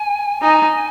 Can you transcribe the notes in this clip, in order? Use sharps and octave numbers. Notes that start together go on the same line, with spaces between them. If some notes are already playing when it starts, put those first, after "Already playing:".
Already playing: G#5
D#4 G#5